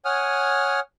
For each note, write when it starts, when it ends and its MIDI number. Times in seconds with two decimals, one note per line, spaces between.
0.05 0.80 73
0.05 0.80 78
0.05 0.80 80
0.05 0.80 87
0.05 0.80 89